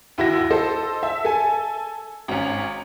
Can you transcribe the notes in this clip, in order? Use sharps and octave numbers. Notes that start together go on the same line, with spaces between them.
D#2 E4 F#4 E6 A#6
A4 C5 D#5
E5
A4 G#5
G#1 C#4